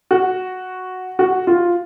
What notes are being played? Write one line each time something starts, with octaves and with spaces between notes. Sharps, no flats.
F#4
F#4
F4